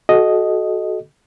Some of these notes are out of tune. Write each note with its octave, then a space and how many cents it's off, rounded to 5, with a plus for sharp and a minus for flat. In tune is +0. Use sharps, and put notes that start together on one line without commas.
F#4 +0 A4 -30 D#5 +0